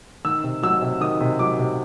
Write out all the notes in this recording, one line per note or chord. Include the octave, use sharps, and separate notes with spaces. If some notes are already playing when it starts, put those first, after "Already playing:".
D#3 E6
C3
F#3 E6
C3
D#3 D#6
C3
F#3 D6
C3